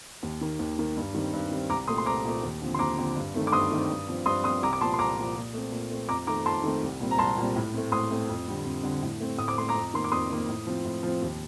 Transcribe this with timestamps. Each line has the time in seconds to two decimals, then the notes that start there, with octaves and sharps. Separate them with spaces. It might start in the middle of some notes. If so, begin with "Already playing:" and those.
0.23 D#2
0.41 D#3 A#3
0.59 D#2
0.79 D#3 A#3
0.97 G2
1.14 D#3 G3 C4
1.33 G2
1.51 D#3 G3 C4
1.70 C2 A#5 D6
1.88 A#2 A3 C4 C6 D#6
1.98 C6
2.06 C2 A#5 D6
2.25 A#2 A3 C4
2.43 D#2
2.62 D3 F3 C4
2.74 C6
2.79 D#2 A#5 D6
2.98 D3 F3 C4
3.16 G2
3.34 D#3 A3 C4
3.47 D6
3.52 G2 C6 D#6
3.72 D#3 A3 C4
3.90 G2
4.08 F3 C4
4.26 G2 C6 D#6
4.44 F3 C4 C6 D#6
4.62 C2 A#5 D6
4.73 D6
4.80 A#2 F3 A5 C6
4.94 C6
4.99 C2 A#5 D6
5.18 A#2 F3
5.36 A#2
5.54 A3 C4
5.72 A#2
5.91 A3 C4
6.09 F2 A#5 D6
6.27 D#3 A3 C4 A#5 D6
6.46 F2 A5 C6
6.64 D#3 A3 C4
6.83 C2
7.00 A#2 G3 C4
7.11 A#5
7.18 C2 A5 C6
7.38 A#2 G3 C4
7.56 A2
7.74 A3 C4
7.92 A2 C6 D#6
8.10 A3 C4
8.29 F2
8.48 D3 G3 C4
8.65 F2
8.83 D3 G3 C4
9.02 A2
9.20 A3 C4
9.38 A2 D#6
9.48 D6
9.58 A3 C4 C6
9.69 A#5 D6
9.75 F2
9.94 D#3 A#3 C6
10.04 D6
10.12 F2 C6 D#6
10.30 D#3 A#3
10.49 A2
10.67 F3 C4
10.85 A2
11.03 F3 C4
11.22 D#2